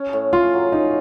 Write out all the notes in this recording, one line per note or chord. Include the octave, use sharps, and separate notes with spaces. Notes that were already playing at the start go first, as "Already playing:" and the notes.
Already playing: C#4
A2
C#4 F4
F#3
C#4 D#4